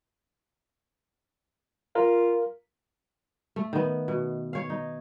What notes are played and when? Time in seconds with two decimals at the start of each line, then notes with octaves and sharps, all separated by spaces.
1.95 F4 A#4
3.56 A3
3.73 D#3 B3
4.08 B2
4.53 C#5 F5
4.70 D#4